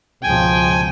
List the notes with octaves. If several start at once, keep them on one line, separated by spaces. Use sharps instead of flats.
C#2 G#2 B2 F3 G5 G#5